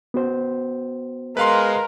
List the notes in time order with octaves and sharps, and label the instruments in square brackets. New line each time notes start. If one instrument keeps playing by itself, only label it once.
[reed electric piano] B3 F#4 C5
[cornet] G#3 [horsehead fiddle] A#4 [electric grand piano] B4 F5 C6